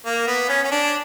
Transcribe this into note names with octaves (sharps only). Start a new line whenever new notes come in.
A#3
B3
C#4
C#4
D4